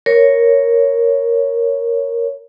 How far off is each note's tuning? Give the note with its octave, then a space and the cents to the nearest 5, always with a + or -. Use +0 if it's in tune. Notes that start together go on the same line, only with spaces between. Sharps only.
A#4 +0 C#5 +0